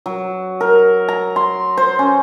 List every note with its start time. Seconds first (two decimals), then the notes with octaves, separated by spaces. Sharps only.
0.06 F#3
0.61 A#4
1.08 A#5
1.36 C6
1.77 C5
1.99 C#4